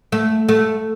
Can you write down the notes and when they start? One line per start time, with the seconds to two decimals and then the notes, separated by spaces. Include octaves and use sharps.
0.12 A3
0.49 A3